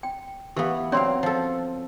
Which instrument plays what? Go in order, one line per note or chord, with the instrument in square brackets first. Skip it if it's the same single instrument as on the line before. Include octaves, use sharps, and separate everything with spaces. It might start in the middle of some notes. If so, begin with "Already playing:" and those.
[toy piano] G5
[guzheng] E3 B3 [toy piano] G4 F5
[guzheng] F#3 C4 F5 [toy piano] C#4 D5 C6
[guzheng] F3 A4